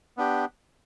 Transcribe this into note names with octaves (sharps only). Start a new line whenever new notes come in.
B3 D4 G4